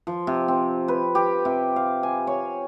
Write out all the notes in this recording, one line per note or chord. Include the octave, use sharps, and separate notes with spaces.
F3
C3
C4
B4
G4
C3
F5
G#5
C#5